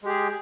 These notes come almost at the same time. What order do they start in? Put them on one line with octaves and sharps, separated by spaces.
G#3 G4 G#4